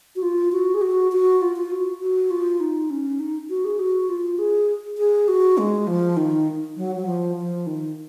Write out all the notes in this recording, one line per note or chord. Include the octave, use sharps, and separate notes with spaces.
F#4
F4
F#4
G#4
F#4
F#4
F4
F4
F#4
F#4
F4
D#4
C#4
D#4
F#4
G#4
F#4
F4
G#4
G#4
F#4
G#3
F3
D#3
F#3
F#3
F3
F3
D#3